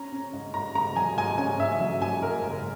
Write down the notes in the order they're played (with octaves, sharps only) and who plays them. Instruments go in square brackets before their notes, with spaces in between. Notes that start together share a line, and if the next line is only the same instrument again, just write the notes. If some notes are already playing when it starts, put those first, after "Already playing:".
Already playing: [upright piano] C#4 A#5
C#4
G#2
G#2 A#5
G#2 A#5
F#3 G#5
G#2 G#5
C#4 G#5
G#2 E5
F#3 E5
G#2 G#5
G#2 A#4
F#1